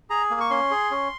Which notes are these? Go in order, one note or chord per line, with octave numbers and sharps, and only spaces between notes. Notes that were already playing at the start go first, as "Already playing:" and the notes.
G#4 A#5
A#3
C#6
C#4 C6
G#4
C#4